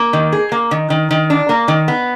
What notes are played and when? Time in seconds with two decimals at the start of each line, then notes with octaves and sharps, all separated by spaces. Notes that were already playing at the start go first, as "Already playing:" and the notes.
Already playing: A#3
0.13 D#3
0.32 G#4
0.52 A#3
0.71 D#3
0.90 D#3
1.11 D#3
1.30 D4
1.49 A#3
1.68 D#3
1.88 B3